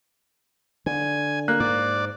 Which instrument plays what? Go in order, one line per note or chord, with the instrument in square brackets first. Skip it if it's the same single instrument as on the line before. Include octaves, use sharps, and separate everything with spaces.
[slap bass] D3 [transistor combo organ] G#5
[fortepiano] A#3 [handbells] F#6
[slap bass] G#2 [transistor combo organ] D5